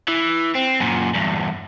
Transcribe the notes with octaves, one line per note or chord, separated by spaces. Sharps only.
E3
C4
F#2 A#2
E2 G2